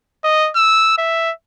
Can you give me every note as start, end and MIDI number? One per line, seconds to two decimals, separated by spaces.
0.24 0.50 75
0.55 0.93 88
0.98 1.32 76